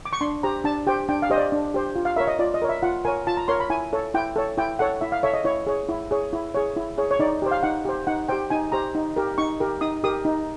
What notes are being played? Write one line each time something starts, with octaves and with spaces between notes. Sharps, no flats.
D6
C#6
D4 C6
G4 C5 A#5
D4 A5
G4 C5 G5
D4 G5
F5
G4 C5 D#5
D5
D4
G4 C5
F4
F5
A#4 C#5 E5
D#5
F4 D5
D#5
A#4 C#5
E5
F4 F#5
A#4 C#5 G#5
F4 A5
A#5
A#4 C#5 C6
B5
E4 G#5
A4 C#5
E4 G5
A4 C#5
E4 G5
A4 C#5 F#5
E4 E5
F5
A4 C#5 E5
D#5
E4 C#5
G#4 C#5
E4
G#4 C#5
E4
G#4 C#5
E4
G#4 C#5
C#5
D#4 D5
G4 C5
F5
D#4 F#5
G4 C5
D#4 F#5
G4 C5 G5
D#4 G#5
G4 C5 A#5
D#4
G4 A#4
D#4 C#6
G4 A#4
D#4 D#6
G4 A#4 D#6
D#4